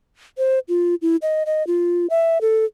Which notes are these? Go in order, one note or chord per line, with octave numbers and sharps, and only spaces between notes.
C5
F4
E4
D#5
D#5
F4
E5
A4